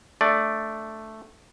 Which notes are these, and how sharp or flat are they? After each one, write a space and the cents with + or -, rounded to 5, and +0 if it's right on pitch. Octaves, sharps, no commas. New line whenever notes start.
A3 +0 D4 +0 D5 +0